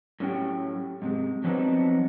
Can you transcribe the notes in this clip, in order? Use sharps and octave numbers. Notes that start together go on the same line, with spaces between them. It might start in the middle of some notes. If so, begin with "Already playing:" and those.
A2 F#3 C#4 G4 G5
G#2 C3 G#3
F3 F#3 B3 C4 D4 D#4